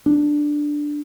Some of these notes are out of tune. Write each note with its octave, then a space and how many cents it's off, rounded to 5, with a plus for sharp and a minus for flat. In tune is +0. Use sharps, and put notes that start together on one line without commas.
D4 +5